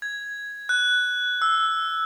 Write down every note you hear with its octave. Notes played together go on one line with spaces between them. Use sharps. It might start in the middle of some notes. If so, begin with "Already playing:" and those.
G#6
F#6
E6